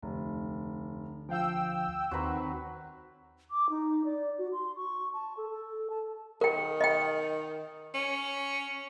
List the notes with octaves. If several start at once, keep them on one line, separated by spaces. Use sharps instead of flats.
F1 D2
F3 F5 G5 E6
D#2 D#3 F#3 C4 B4 A#5 C6
D6
D#4
D5
F#4
C6
C#6
A5
A4
A4
A5
D#3 A#4 G5
D#5 G5
C#4